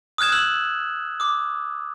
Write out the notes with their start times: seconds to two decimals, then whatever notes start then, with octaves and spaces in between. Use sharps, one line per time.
0.18 D#6 F6 F#6 G#6 E7
0.32 E6 F#6 F#7
1.20 D6 D#6